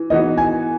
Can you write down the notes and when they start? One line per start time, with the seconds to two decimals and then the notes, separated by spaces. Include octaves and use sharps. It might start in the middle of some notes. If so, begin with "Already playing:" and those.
Already playing: E3
0.10 E3 B3 D#4 F#4 D#5
0.37 G#5